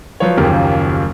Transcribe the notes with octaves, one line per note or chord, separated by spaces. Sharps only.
F3 F#3 B4 C#5
F#1 D#2 C#3 F3 G4 A#4